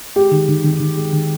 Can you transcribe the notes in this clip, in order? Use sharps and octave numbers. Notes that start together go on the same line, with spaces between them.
G#3 G4
D#3
D#3
D#3
D#3
G#3
D#3